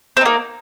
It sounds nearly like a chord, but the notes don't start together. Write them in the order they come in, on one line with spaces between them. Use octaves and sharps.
C4 D#4 A#3